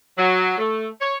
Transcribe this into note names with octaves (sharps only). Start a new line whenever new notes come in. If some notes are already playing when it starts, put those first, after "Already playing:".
F#3
A3
C#5